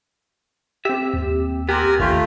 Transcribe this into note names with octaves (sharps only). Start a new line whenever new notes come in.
C4 G4 E5
D#2
B3 C4 G4 A#4 G#5
A1 D#2 A3 C#4 F4 G4